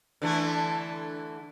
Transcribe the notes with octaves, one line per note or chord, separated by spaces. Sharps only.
D3 E3 A3